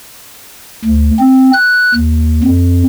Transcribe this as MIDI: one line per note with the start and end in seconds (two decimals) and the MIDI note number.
0.84 1.10 38
1.19 1.51 60
1.54 1.94 90
1.94 2.40 39
2.43 2.83 41